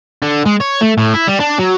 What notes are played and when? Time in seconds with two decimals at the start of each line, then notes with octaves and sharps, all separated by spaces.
0.22 D3
0.45 G#3
0.60 C#5
0.81 A3
0.98 A2
1.14 E4
1.27 G3
1.40 D4
1.59 F#3